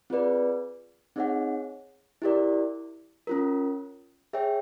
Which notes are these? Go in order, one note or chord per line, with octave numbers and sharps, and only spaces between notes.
C4 F4 G#4 B4 D5
C4 D#4 G#4 C#5 F#5
E4 G4 A#4 D5
C#4 F4 A#4
G#4 C#5 E5 G5